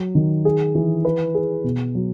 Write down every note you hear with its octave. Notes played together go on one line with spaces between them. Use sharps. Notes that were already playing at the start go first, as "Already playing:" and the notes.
Already playing: F#3
D#3
G#4
E3
B4
G#4
B2
F#3